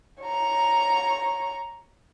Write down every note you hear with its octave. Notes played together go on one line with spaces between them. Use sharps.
C#5 A#5